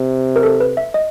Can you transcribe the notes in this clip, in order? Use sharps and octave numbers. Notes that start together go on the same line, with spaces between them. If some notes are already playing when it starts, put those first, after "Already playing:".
Already playing: C3
A#4
A4
B4
E5
D#5